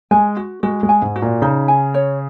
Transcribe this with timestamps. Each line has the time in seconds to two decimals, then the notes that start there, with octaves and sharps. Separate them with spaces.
0.11 G#3 G#5
0.37 F#4
0.63 G#3 F#4
0.83 G#3
0.89 G#5
1.02 G#2
1.16 F#4
1.22 A#2
1.42 C#3 D#4
1.68 G#5
1.94 C#5